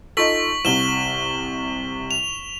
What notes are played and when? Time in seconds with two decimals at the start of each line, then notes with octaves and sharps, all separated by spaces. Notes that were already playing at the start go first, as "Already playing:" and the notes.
0.17 D#4 F4 A4 C#6 B6 F#7
0.65 C2 C3 E7 G7
2.11 F7